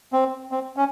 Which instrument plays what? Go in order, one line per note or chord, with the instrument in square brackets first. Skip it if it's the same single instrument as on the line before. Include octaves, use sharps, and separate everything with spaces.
[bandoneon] C4
C4
C#4